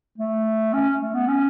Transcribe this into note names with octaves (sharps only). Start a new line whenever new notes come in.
A3
C#4
A3
B3
C#4